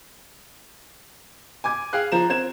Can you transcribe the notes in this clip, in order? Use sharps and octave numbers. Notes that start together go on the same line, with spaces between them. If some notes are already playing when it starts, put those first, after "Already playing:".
G#5 D6 G#6
G#4 F5 G5 F#6
F3 A#5 E7
C4 G#6 E7